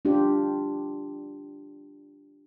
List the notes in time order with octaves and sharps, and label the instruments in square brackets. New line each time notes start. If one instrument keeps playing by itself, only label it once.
[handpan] D4 F4 G4